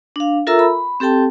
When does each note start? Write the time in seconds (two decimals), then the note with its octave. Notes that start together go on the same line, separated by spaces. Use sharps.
0.16 D4 F5
0.47 F4 A4 A#4 E5 A#5 E6
0.59 B5
1.00 C4 G4 A4 G5 A5